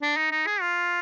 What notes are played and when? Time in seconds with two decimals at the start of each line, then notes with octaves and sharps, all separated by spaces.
0.02 D4
0.17 D#4
0.32 D#4
0.46 G#4
0.61 F4